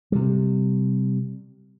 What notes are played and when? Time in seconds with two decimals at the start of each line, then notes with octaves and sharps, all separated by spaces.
0.12 C3 G3